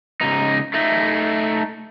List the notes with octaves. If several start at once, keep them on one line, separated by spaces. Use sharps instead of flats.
C#2 D#4
A3 D#4